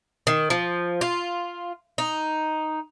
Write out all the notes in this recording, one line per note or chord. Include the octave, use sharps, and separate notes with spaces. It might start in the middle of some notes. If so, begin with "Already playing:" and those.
D#3
F3
F4
D#4